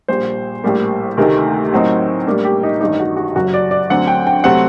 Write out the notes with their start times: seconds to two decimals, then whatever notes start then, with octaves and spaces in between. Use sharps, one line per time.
0.08 A#1 A#2 G3 C5
0.64 A#1 A2 G3 A#3
1.17 D2 C3 D#3 A3 A#4
1.72 A2 F#3 C4 D#4
2.27 A2 G3 A#3 D4
2.44 G4
2.63 D#4
2.81 A1 G2 D#3 G3 D#4
3.00 F#4
3.17 F#4
3.36 F#1 F#2 F#3 F#4
3.54 D5
3.71 D5
3.90 D2 D3 F#3 C4 F#5
4.07 G5
4.27 G5
4.44 C3 F#3 A3 C4 F#5